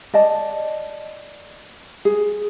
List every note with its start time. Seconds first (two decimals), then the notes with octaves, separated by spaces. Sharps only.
0.14 D5 D#5 A5
2.05 G#4